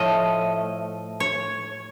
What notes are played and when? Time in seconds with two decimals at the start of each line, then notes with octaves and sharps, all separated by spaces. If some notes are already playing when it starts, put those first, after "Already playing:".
Already playing: A2 F3 A3 D#5
1.20 C#5